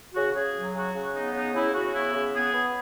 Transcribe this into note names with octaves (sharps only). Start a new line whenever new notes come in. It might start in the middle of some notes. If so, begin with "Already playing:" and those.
C#3 F#4
C#3 G#4
F#3
C#3 F#4
C#3
B3 D#4
C#3 D#4
C#3 E4
C#3 F#4
B3 E4
C#3
B3 G#4
B3